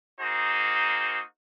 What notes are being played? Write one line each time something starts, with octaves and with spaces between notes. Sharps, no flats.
A#3 D#4 F#4 G#4 C5